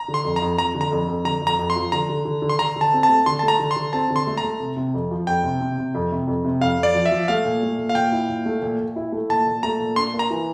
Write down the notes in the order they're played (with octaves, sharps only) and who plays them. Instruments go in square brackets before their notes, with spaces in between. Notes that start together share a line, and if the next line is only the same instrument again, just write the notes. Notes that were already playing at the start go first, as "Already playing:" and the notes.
Already playing: [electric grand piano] A#5
[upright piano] D3
[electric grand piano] C6
[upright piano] F2
[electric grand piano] A#5
[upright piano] F2
[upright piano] F2 [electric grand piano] A#5
[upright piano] D3
[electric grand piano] A#5
[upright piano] F2
F2
[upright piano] D3 [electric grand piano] A#5
[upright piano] F2
[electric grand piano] A#5
[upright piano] F2
[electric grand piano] C6
[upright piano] F3
[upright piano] D3 [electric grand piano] A#5
[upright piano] D3
D3
D3
[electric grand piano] C6
[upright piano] D3 [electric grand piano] A#5
[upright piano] D3 [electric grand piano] A5
[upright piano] C4
[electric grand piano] A5
[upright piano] A3
[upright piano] D3 [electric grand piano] C6
[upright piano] A3 [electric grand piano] A5
[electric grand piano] A#5
[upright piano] D3
[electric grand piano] C6
[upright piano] D3
[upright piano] C4 [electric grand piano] A5
[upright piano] D3
[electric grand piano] C6
[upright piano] A3
[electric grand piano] A#5
[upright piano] A3
C3
C3
F2
F3
[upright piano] F2 [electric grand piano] G5
[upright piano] C3
C3
C3
F2
C3
F2
C3
[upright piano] F2 [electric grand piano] F5
[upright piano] F2 [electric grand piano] D5
[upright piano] F3
[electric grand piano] E5
[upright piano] F3
[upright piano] A3 [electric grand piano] F5
[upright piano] A#2
A3
A#2
[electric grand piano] F5
[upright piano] A#2 [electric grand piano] G5
[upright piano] E4
A#2
A3
A#2
A#2
E4
A3
[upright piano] A#2 [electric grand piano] A5
[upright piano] A#2
[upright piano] A3 [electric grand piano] A#5
[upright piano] A#2
[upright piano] D4 [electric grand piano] C6
[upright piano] A#3
[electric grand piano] A#5
[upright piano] E3